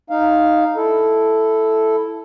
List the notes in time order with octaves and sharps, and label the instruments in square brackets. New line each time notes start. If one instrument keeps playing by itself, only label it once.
[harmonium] D#4 F5
E4 A4